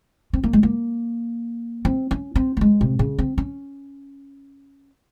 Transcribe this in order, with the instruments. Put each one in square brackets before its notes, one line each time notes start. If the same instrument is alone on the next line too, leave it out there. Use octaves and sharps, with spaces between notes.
[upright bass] C4
A#3
G#3
A#3
C4
C#4
C4
A#3
G#3
C3
C#3
C4
C#4